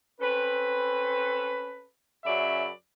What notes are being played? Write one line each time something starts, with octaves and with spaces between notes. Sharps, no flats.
C4 C#4 A4 B4
F#2 C#3 F#3 D5 E5 B5